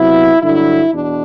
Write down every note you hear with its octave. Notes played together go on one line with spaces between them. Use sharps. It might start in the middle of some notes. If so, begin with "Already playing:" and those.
Already playing: C3 F#3 B3 E4
G2 D3 F#3 E4
E2 B2 D4